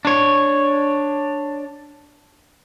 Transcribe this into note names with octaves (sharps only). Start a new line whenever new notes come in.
D4 C#5